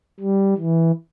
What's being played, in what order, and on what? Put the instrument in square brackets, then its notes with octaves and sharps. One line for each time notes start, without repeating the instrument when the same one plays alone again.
[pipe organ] G3
E3